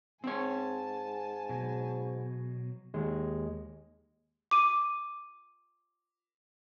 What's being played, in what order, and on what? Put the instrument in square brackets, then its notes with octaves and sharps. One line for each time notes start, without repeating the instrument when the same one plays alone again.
[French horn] G#2 [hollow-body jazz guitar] C4 C#5 [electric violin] G#5 A5
[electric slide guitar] B2 F#3
[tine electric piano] D#2 G#3
[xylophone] D6 D#7